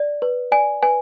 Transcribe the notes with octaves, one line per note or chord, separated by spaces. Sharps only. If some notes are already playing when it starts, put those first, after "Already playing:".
Already playing: D5
B4
D5 G#5
B4 G#5